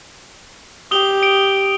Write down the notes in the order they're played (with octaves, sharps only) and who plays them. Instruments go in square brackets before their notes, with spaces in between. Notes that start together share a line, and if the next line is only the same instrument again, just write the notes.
[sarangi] G4 [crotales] D#6 F7 G7
[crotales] D7